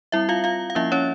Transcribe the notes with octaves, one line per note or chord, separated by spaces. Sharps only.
G3 C4 E4 E5
F4 F5
F4 F5
F5
F3 A#3 C#4 E4 E5
C#4 C#5